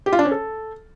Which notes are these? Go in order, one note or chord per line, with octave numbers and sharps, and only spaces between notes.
G4
F4
D4
C#4
A4